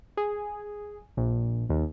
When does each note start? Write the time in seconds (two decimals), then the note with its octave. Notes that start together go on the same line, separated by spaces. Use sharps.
0.17 G#4
1.17 A#1
1.69 D#2